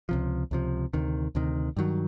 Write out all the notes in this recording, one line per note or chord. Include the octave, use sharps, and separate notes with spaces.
C#2 C3 F3
C#2 C3 F3
D2 C3 D#3
D2 C3 D#3
G2 D#3 F#3